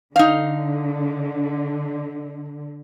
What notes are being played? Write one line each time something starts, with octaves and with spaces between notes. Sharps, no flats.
D3 D#4 F5